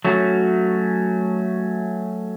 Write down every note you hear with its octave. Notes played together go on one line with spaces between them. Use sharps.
F#3 A3 C#4 F#4